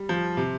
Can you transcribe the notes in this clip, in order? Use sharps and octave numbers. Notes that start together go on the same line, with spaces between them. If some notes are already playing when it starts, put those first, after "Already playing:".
Already playing: G3
F3
C3